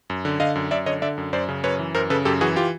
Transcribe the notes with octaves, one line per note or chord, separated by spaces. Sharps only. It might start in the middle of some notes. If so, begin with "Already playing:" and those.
F#2
D3
D3 D#5 F5
F#2
F#2 D5 E5
D3 C#5 D#5
D3 D5 E5
F#2
F#2 C5 D5
C#3
F#2 B4 C#5
E3
F#2 A#4 C5
C#3 A4 B4
F#2 G4 A4
E3 F#4 G#4
F4 G4